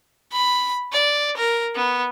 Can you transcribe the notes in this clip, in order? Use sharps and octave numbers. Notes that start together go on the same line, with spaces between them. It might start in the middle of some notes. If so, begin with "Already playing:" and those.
B5
D5
A#4
B3